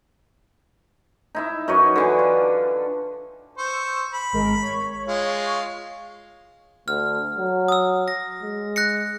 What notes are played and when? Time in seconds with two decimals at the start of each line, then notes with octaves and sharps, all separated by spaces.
1.35 D#4 E4 E5
1.68 F#2 D#4 B4 C#5
1.96 D3 E3 D4
2.19 F4
3.58 C5 C#6 E6
4.13 B5
4.32 G#1 G#3 A#4
4.61 C#5
5.08 G#3 F4
6.88 D2 F6
7.38 F#3
7.68 D#6 E6
8.08 A#6
8.42 G#3
8.76 F#6 A#6 C#7